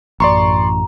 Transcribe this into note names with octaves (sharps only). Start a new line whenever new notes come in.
A1 F#2 A2 D5 A#5 C6 C#6